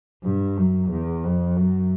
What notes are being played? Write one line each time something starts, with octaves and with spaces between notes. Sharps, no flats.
G2
F#2
E2
F2
F#2